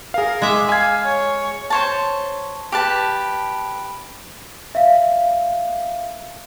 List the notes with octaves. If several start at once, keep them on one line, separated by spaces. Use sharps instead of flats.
G#4 A#4 F5
G#3 E5 D6
F5 G#5 G#6
C#5
C5 C#5 A5
G4 B4 A5
E5 F5